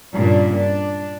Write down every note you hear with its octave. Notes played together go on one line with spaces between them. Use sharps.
G2 A#2 C#3 D4
D4